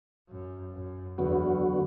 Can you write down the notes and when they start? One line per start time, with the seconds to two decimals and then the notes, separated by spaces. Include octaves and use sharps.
0.29 F#2
0.73 F#2
1.18 E2 D3 F#3 B3 F#4